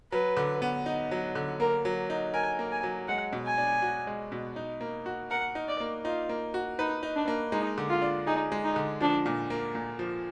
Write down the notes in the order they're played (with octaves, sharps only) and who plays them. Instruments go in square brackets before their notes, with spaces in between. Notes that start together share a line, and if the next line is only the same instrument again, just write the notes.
[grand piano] F#3 [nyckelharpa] B4
[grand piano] D3
B3
D#4
F#3
D3
[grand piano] A#3 [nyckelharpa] A#4
[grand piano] F#3
D#4
[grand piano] A#4 [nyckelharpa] G#5
[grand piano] A#3
[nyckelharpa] G#5
[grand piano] F#3
[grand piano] G#3 [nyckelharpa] F#5
[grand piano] B2
[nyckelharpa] G#5
[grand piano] D4
F#4
G#3
B2
D#4
A#3
F#4
[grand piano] A#4 [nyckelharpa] F#5
[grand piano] D#4
[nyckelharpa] D5
[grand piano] A#3
[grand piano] D#4 [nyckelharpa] F4
[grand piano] A#3
F#4
[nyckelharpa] D#4 [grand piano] B4
[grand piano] D#4
[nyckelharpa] D4
[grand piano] A#3
[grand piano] G#3 [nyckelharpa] D#4
[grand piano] D3
[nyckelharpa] F4
[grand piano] D4
[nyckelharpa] D#4 [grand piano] G#4
[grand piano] G#3
[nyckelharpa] D#4
[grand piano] D3
[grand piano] F3 [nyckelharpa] D4
[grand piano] A#2
A#3
A#2
F3